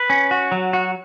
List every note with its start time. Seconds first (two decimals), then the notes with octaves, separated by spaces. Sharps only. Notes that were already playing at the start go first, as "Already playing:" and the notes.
Already playing: B4
0.10 C#4
0.31 F#4
0.52 F#3
0.73 F#4